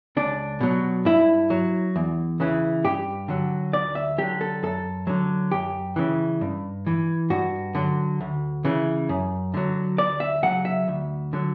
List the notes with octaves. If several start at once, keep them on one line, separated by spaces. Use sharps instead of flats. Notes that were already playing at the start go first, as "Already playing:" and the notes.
C#2 D4
B2 F#3
G2 E4
F#3
E2
C#3 E3
G2 G4
D3 F#3
D2 D5
E5
D3 F#3 G4
A4
F#2 A4
D3 F#3
F#2 G4
C#3 E3
G2
E3
G2 F#4
D3 F#3
D2
C#3 E3
F#2
D3 F#3
D2 D5
E5
C#3 F#3 F#5
E5
D2
D3 F#3